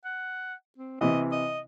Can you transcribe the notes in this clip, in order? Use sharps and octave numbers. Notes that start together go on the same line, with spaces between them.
F#5
C4
C3 E3 D#5
D#5